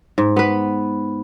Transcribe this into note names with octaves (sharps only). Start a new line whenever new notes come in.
G#2
B3 B4